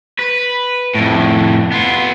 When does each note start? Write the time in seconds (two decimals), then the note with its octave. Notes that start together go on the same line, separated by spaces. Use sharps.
0.19 B4
0.95 F2 A2
1.72 B3 F4